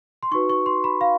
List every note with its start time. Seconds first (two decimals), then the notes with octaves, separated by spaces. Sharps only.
0.23 C6
0.31 D#4 F#4 B4 C#6
0.50 C#6
0.66 C6
0.84 B5
1.01 F5